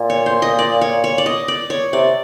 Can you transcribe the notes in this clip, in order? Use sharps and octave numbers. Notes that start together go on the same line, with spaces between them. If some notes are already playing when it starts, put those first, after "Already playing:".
Already playing: A#2
C#5
C5
D#5
D5
C#5
C#5
D5
D#5
D5
C#5
C3 D5